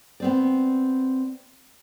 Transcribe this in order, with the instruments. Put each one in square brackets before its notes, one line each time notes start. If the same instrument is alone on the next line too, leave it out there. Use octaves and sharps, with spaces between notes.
[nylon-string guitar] B3 C4 D5